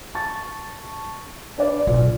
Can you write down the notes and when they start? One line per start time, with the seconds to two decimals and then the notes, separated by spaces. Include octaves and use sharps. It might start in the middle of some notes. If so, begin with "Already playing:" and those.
0.15 A5 C#6 A6
1.58 D4 B4 D5
1.87 B1 F4